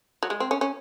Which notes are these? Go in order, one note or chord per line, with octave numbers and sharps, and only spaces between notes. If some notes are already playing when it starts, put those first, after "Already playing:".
F#3
G#3
C4
C#4
C#4